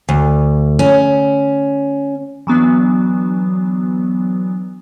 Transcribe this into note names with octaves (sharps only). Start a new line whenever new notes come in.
D2
C#4
E3 F#3 B3 D4